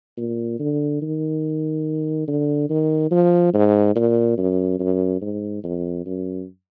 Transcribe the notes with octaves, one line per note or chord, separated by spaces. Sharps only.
A#2
D3
D#3
D3
D#3
F3
G#2
A#2
F#2
F#2
G#2
F2
F#2